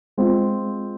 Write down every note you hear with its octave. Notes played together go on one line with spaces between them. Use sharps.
G#3 C4 F4